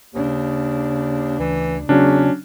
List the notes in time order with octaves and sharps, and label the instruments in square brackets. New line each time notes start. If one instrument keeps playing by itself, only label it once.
[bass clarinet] D#2 [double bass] C#3 D4
[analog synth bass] D2 [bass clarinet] E3
[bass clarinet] E2 [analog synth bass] C#3 [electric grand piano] F#3 C#4 D4